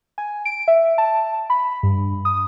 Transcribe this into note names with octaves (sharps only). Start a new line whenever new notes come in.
G#5
D7
E5
A5
B5
G2
D#6